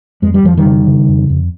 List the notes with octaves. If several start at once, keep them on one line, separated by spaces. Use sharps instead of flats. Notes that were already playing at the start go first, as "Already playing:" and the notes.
F2 G#3
G3
F2 F3
D#3 G3
C#3
C#3
F2
F2